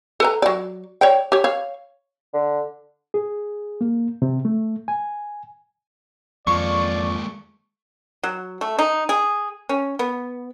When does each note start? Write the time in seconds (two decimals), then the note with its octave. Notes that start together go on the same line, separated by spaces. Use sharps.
0.20 A4 B4 A#5
0.42 F#3 D5
1.01 C#5 D5 G5
1.32 G4 C#5
1.44 C#5 F5
2.34 D3
3.14 G#4
3.81 A#3
4.22 C3
4.45 A3
4.88 G#5
6.47 F2 G#3 A#3 D5 C#6
8.24 F#3
8.61 A3
8.79 D#4
9.09 G#4
9.69 C#4
9.99 B3